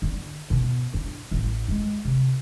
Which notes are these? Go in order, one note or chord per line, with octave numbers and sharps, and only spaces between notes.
D3
B2
D4
A1
G#3
C3